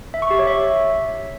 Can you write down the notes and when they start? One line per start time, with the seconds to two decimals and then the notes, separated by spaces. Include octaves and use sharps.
0.14 E5
0.22 C#6
0.31 G4
0.39 C#5
0.47 E5